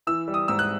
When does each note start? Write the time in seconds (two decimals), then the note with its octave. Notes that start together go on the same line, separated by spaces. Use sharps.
0.07 E3 E6
0.28 G3
0.34 D#6
0.48 G#2 E6
0.59 F#6